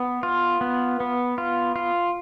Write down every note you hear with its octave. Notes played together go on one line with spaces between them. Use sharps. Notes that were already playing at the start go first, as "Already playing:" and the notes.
Already playing: B3
F4
B3
B3
F4
F4